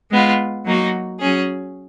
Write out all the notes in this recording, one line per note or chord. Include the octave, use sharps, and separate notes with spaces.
G#3 B3 F4
F#3 A#3 D#4 F#4
F#3 C#4 G#4